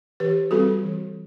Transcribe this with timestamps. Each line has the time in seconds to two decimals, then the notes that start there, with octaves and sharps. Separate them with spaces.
0.20 E3 G4 B4
0.51 G3 C4 F#4 A4
0.83 E3